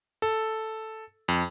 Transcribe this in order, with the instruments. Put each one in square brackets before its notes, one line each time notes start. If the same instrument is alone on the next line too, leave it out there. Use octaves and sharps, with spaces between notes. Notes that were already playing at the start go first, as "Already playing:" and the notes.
[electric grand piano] A4
F2